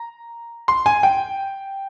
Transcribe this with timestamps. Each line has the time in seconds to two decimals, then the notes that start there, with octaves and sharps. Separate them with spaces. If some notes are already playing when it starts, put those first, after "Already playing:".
Already playing: A#5
0.68 C6
0.86 G#5
1.03 G5